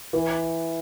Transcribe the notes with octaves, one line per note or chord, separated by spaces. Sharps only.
E3